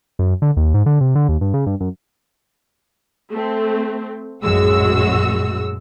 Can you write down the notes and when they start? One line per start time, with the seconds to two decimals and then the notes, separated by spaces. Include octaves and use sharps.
0.19 F#2
0.42 D3
0.57 D#2
0.74 G#2
0.86 D3
1.01 C3
1.15 D3
1.29 D#2
1.41 G2
1.54 C#3
1.67 G2
1.80 F#2
3.31 A3 C4
4.43 A#1 F#2 A2 G#3 F#4 E6